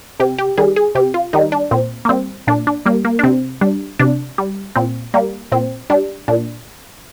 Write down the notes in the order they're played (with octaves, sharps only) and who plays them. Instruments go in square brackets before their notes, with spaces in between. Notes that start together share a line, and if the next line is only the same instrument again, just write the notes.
[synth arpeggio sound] C3 G4
G4
D#3 G3 G#4
G#4
C3 G4
F4
D#3 G3 D#4
D4
A#2 C4
A#3
G3 C4
A#2 D4
D4
G3 A#3
A#3
D4
C3 C4
G3 D4
C3 D4
G3
A#2 C4
G3 A#3
A#2 C4
G3 D4
A#2 D4